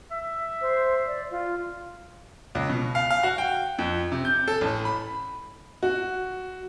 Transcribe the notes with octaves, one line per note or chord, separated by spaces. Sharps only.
E5
C5
D5
F4
C#2
B2
F5
F5
F#4
G5
F2
C3
G6
A4
A1
B5
F#4